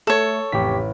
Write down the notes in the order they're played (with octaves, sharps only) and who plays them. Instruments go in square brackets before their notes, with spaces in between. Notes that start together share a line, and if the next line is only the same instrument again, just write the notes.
[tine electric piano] A3 [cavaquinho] A4 C#5
[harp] A1 [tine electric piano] F2 G4 B6